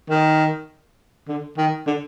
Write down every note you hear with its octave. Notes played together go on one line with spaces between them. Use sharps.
D#3
D3
D#3
D3